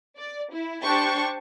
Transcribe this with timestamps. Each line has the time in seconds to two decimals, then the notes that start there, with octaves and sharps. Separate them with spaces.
0.18 D5
0.52 E4
0.82 D4 G4 C5 G5 A5 C#6